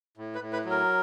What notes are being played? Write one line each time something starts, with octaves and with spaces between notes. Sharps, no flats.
A2
B4
A2
B4
F#3
A#4